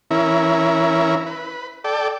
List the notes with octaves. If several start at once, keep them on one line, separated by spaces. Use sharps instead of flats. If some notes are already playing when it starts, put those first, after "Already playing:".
E3 C#4 E4 A#4
B4
A4 D5 G5